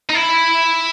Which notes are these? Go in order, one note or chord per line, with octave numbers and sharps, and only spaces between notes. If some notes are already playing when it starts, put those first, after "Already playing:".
D#4
E4